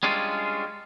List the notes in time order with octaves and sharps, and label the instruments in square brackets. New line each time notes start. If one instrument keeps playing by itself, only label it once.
[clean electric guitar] G3 G#3 C#4 D4 F4